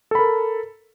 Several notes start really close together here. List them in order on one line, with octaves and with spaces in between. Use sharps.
A4 B5 A#4